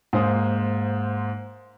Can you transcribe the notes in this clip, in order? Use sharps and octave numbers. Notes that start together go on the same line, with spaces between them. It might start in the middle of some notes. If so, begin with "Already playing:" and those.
G#2 A#3 C5 G#5 D#6